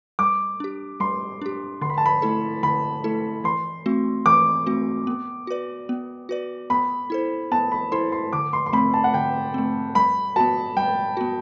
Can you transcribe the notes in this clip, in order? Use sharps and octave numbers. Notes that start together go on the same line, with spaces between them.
G3 D6
D4 G4
G3 C6
D4 G4
D3 C6
B5
A5
B5
A3 E4 A4
D3 B5
A3 E4 A4
E3 C6
A3 C4 F#4
E3 D6
A3 C4 F#4
B3
F#4 B4 D5
B3
F#4 B4 D5
B3 B5
E4 A4 C5
B3 A5
B5
E4 A4 C5 C6
C6
D3 D6
C6
C6
A3 C4 B5
A5
F#5
D3 G5
A3 C4
G3 B5
B3 F#4 A5
G3 G5
B3 F#4